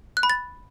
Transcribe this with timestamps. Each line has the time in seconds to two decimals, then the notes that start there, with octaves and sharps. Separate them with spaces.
0.17 F#6
0.23 B5
0.30 A6